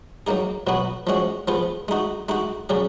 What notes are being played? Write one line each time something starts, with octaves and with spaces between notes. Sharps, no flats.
F#3 A#3 D#4 G#4
B2 F#3 B3 F#4
F3 G#3 C#4 F#4
F3 B3 F4 G#4
G#3 D#4 F#4
G#3 D#4 F#4
C#3 F#3 C#4 G#4